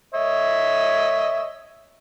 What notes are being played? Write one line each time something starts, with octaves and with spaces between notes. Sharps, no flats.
C#5 D#5 E5